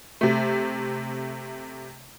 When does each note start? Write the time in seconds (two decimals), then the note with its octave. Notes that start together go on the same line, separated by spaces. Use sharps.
0.21 C3 A3